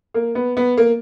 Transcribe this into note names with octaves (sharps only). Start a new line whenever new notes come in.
A#3
B3
B3
A#3